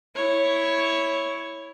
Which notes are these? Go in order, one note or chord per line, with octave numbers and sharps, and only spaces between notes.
E4 C#5